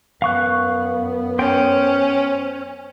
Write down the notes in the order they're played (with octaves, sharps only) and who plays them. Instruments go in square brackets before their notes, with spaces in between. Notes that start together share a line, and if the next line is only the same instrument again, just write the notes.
[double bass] F#2 B3 [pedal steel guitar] F5 C#6 F#6
[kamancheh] C#4 [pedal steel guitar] C5 G5